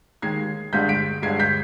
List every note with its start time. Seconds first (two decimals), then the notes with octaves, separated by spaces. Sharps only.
0.22 D#2 D#3 G#3 G#6 C7
0.73 G1 G2 D3 G#3 G6 B6
0.89 B6 D7
1.22 G1 G2 D3 G#3 G#6 C7
1.40 G6 B6